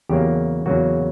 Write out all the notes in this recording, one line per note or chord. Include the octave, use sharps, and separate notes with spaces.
E2 C#3 F#3 A#3 G4
E2 C#3 F#3 A#3 F#4